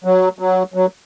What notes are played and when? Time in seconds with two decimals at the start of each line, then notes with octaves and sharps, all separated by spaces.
0.04 F#3
0.39 F#3
0.74 F#3